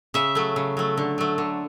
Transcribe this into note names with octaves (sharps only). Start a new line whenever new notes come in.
C#3 E5
F#3 A3
C#3
F#3 A3
D3
F#3 A3
D3